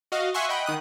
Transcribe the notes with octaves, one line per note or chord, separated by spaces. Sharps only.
F#4 D#5 F5
E5 F#5 G#5 C6 C#6
D#5 F#5 G5 B5
D#3 D#6 F#6